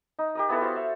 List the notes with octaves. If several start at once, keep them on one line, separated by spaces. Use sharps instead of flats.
D#4
G4 A#4 D#5
B3 E4 A4 B4
F#4 C5 F5
E5